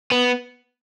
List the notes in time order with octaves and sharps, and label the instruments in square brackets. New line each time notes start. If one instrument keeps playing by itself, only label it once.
[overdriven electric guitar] B3